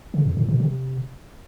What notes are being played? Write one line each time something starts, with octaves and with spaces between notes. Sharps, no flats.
C#3
F2
A2
B2
C3